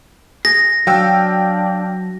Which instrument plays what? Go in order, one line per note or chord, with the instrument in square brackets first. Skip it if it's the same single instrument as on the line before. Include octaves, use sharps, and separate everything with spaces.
[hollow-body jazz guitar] G#4 [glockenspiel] A#6
[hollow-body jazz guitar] F#3 [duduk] D4 [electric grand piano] F5 G5 E6